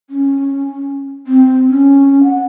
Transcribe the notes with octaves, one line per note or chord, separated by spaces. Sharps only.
C#4
C4
C#4
F#5